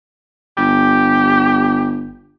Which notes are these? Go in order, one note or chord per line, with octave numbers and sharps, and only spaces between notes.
G1 G4